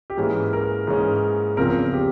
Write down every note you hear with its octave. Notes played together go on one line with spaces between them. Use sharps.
G4
G#2 E3 A#3 C#4 G#4
A#4
G#2 E3 A#3 C#4 G#4
E2 C#3 F3 C4 A#4
G4